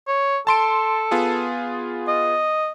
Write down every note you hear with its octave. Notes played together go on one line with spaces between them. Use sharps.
C#5
A4 A5 C6 D7
B3 F4 G#4
D#5